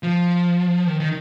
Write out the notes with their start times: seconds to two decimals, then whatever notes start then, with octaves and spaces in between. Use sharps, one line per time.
0.03 F3
0.87 D#3
1.00 D#3